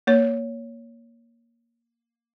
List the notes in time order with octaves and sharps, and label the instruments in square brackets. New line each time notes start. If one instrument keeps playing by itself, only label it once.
[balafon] A#3 C#5